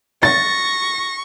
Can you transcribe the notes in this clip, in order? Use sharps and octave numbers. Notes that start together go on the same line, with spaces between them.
C#6 A6 A#6